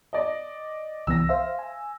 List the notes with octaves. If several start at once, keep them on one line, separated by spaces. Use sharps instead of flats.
D5 D#5
C2 E3 B3 E6 A#6
C5 E5 F5
G#5